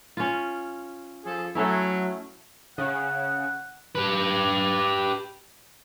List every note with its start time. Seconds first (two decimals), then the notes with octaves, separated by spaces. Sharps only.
0.17 C#4 F4
1.24 F3 G#4 A4
1.55 F#3 A3 C#4 E4
2.78 C#3 F#5
3.95 G4 B4